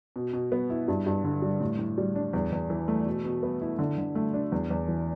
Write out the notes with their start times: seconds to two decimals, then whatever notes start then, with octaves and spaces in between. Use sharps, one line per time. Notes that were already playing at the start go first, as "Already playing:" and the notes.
0.16 B2
0.33 B2
0.52 B3
0.70 E4
0.88 G2
1.06 G2
1.24 D3
1.42 G3
1.61 A2
1.79 A2
1.98 G3
2.15 D4
2.33 E2
2.52 E2
2.70 E3
2.88 A3
3.06 B2
3.25 B2
3.43 B3
3.61 E4
3.79 D3
3.98 D3
4.15 A3
4.33 D4
4.52 E2
4.70 E2
4.88 E3